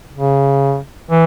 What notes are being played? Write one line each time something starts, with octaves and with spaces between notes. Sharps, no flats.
C#3
E3